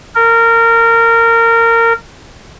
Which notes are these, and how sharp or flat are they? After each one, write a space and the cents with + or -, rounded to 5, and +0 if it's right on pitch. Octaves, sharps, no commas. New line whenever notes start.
A#4 -20